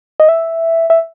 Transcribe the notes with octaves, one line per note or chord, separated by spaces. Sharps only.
D#5
E5
E5